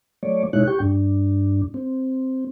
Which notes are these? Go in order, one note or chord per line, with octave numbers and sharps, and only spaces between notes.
F#3 A3 C#5 D5
B2 G#3 D#4 E4 C#5 F#6
G4 G5 C#6
G2 D4
C4